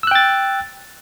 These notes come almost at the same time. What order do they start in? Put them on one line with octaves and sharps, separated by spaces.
E6 F#6 G5 A6